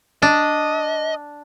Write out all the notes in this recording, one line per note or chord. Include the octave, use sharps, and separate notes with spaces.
D4 D#5